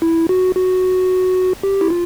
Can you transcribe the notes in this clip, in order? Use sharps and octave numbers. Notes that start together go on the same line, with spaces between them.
E4
F#4
F#4
G4
E4
F4